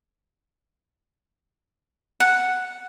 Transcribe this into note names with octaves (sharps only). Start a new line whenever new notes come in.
F#5